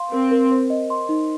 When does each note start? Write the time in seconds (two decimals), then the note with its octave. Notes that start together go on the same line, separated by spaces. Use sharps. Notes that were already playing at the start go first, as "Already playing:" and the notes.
Already playing: F5 C6
0.12 C4 A#4
0.31 A#4
0.51 C5
0.70 D#5
0.90 C6
1.09 D#4